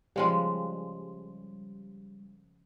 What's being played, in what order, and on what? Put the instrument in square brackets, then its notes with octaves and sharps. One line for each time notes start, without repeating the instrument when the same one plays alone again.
[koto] C#3 F3 G#3 [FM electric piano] G3